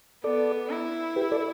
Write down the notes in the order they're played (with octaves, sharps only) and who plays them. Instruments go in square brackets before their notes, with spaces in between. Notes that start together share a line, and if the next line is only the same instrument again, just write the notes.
[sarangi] B3 [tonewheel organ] A4 D5
[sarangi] E4
[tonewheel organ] G4 B4
A4 D5